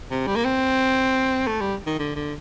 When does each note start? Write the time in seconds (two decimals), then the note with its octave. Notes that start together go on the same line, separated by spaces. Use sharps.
0.11 C3
0.27 G3
0.36 A#3
0.45 C4
1.47 A3
1.61 G3
1.86 D#3
1.99 D3
2.16 D3